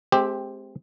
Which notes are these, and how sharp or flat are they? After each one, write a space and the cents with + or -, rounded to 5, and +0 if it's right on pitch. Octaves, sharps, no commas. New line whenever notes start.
G#3 +40 C4 +0 G4 +10